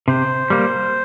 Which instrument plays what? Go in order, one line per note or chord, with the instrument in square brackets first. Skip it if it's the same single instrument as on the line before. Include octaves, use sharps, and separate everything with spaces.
[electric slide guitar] C3 [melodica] C5
[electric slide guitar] G3 A#3